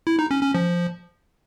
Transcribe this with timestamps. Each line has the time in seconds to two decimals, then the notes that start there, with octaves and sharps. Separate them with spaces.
0.07 E4
0.19 D#4
0.31 C#4
0.43 C#4
0.54 F3